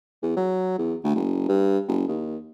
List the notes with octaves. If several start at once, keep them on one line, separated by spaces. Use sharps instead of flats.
E2
F#3
E2
D2
F#1
G2
F#1
D#2